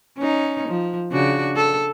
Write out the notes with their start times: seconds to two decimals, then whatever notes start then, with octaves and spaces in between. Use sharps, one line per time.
0.18 C#4 D#4
0.68 F3
1.11 C#3 D4 F#4
1.56 A4